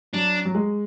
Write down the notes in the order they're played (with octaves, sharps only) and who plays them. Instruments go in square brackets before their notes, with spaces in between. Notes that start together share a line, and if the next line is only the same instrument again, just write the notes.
[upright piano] F#3 [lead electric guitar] D4
[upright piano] F#3
G#3